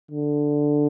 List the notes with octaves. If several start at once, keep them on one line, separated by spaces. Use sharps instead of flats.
D3